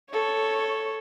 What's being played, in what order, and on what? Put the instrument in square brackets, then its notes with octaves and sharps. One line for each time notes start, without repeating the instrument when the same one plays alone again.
[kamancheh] A4 C#5